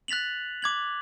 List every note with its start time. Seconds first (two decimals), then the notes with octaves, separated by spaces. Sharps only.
0.08 F#6 A6 B6 F7 F#7
0.62 D6 G#6 F#7